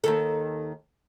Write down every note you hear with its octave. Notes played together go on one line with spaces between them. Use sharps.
D#2 D#3 A4